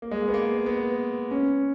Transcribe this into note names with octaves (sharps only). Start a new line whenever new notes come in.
A#3
G#3
A#3
B3
A#3
B3
C#4